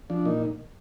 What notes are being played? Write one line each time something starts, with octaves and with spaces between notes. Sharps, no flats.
F3 D4
A#2 D#4